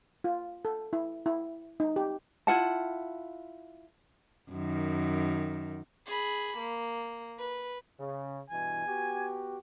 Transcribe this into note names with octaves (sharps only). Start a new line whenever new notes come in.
F4
A4
E4
E4
D#4
G4
E4 F4 F#5 A5
F#2 D#3
G#4 B5
A#3
B4
C#3
G2 B2 E3 G#5
B3 F#4 G4